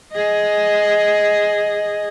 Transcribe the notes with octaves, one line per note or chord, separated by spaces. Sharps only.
G#4 D#5